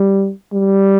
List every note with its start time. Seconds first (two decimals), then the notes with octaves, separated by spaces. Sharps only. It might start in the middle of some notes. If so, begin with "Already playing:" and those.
Already playing: G3
0.53 G3